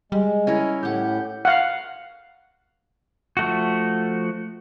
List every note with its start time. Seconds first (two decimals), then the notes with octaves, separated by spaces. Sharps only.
0.12 G3 G#3
0.47 C#4 E4 A#4
0.83 A2 G4 F#5 G6
1.45 F5 F#5
3.37 F3 A3 F#4